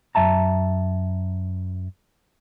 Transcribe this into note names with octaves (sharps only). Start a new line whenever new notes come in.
F#2 E5 A5 A#5